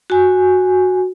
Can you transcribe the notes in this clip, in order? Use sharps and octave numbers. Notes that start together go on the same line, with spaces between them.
F#4 G#5